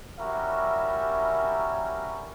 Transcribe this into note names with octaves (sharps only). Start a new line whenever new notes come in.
G3 C#4 E4 F#4 A#4 E5